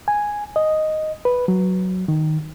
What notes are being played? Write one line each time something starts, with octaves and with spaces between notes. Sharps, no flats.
G#5
D#5
B4
F#3
D#3